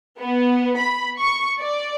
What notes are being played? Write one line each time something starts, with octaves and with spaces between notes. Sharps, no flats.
B3
B5
C#6
D5